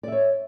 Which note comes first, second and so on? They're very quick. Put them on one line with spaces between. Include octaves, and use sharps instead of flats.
D5 E5 C#5